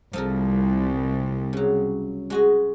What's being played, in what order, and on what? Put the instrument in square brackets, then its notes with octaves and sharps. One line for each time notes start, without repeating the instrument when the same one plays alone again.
[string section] C2 [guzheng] F3 A4 A#4
[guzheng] C#3 F#3
G#3 F#4 D#5